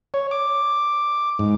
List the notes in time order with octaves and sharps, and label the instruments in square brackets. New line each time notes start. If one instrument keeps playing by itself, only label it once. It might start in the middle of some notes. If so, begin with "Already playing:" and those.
[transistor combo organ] C#5
D6
G#2